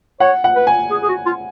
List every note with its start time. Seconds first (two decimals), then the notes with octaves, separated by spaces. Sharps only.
0.20 C#5 F#5
0.44 F#5
0.55 B4
0.67 G#5
0.90 G#4
1.02 G#4
1.08 F#4
1.26 F4